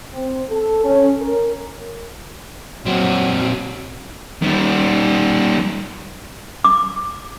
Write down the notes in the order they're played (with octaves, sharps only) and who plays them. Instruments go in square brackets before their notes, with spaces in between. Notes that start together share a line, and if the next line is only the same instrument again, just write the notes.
[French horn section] C4
A4
C#4
A#4
[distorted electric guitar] A#2 C4 [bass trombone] F#3
[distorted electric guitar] D#3 G3
[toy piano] D6